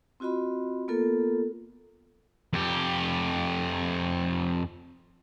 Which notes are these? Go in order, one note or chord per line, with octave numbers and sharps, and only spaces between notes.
C4 F4 F#4 D#5 B5
A#3 B3 F4 A4 A#4
F2 G4